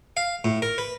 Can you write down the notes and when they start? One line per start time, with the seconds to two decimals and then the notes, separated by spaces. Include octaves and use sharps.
0.17 F5
0.45 A2
0.62 A#4
0.78 B4